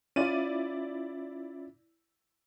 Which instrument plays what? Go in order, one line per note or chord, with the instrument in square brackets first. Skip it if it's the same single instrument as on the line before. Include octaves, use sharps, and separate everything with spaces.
[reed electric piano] C#4 F4 [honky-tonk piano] E4 D5 D#7